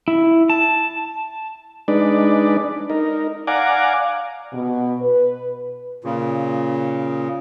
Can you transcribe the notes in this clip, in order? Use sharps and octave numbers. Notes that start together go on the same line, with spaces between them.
E4
A5
G#3 D4 D#4 B4 D5
D#4 A#4
D5 F5 F#5 G#5 A#5 D6
B2
B4
A#2 C#3